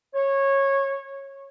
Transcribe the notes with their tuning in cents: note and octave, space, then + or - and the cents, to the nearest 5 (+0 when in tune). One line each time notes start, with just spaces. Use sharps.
C#5 -15